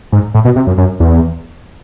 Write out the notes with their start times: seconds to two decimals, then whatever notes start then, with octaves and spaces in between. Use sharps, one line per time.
0.12 G#2
0.34 A2
0.45 B2
0.56 C3
0.67 F#2
0.78 F#2
1.00 E2